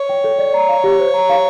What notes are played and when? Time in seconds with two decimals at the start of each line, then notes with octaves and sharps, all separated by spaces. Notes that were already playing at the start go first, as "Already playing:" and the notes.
Already playing: C#5
0.09 G5
0.24 A4
0.39 D5
0.54 A#5
0.69 F5
0.84 G4
0.99 C5
1.14 A#5
1.29 F5